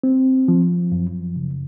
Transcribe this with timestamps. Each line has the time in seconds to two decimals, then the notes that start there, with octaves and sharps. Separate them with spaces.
0.03 C4
0.48 F3
0.92 F#2
1.36 C#3